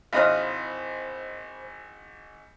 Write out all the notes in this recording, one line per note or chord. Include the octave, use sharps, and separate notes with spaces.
G#1 E4 C5 D#5 F5 B5 F#6